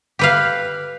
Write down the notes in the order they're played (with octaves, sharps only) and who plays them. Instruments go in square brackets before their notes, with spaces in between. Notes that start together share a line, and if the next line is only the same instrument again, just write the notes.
[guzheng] G4 B4 F5